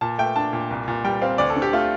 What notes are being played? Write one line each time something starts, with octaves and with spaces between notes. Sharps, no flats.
A#2 A5
A3 G5
D4 A5
A#2
C2
A#2
G3 G5
C4 F5
D2 D5
A4
D3
G4
A3 F4